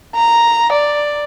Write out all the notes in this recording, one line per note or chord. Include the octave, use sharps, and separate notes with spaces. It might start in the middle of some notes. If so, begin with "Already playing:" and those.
A#5
D5